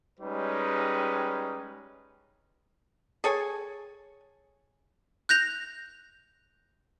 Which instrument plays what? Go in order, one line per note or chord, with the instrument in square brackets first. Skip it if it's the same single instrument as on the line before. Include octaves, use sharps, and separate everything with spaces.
[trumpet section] G3 G#3 C#4 D#4 G4 B4
[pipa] G#4 A4 C#5 G#5
[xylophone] F#6 G6 A#6 F7